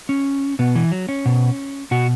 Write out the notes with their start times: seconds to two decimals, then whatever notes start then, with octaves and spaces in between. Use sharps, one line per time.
0.09 C#4
0.59 B2 B3
0.75 E3
0.92 F#3
1.09 C#4
1.26 B2
1.91 B2 F#4